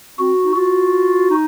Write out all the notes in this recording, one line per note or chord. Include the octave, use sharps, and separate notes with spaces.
C4 F#4
D#4
F4 F#4
D#4